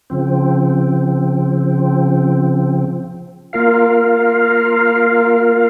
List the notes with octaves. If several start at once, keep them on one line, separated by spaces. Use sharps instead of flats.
C#3 F3 C4
A#3 F4 A#4 F5